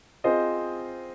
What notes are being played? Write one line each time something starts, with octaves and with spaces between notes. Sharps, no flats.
C4 F4 G#4 C5 D#5